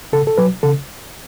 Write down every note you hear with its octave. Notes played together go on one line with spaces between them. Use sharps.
C#3 A4
A4
F#3 B4
C#3 A4